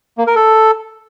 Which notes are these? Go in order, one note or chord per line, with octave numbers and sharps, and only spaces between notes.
A#3
A#4
A4